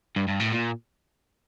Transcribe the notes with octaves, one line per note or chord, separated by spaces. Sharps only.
G2
G2
A2
A#2